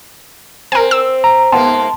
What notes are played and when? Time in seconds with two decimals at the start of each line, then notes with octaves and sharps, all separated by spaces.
0.72 C4 A#4 G#5
0.91 E6
1.24 A#5
1.52 G#2 A#3 B3 A5 C6